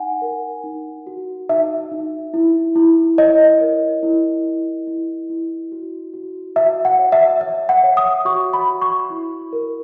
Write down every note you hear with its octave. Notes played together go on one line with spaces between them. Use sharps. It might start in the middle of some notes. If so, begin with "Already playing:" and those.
Already playing: D#4 F#5 G#5
A#4
D#4
F#4
D#4 E5
D#4
E4
E4
C#5 D#5
A#4
E4
E4
E4
E4
F#4
F#4
F#4 E5
F#5
C#5
E5
C#5 E5
F#5
C#5
D#6
F#4 C#6
B5
F#4
C#6
E4
A#4